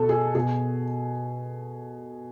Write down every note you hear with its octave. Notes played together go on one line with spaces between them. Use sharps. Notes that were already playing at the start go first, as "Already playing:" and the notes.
Already playing: B2 A4
G#4
B2 G#4